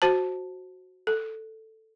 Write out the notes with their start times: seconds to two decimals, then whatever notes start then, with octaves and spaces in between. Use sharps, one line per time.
0.02 F#4 C5 A5
1.07 A4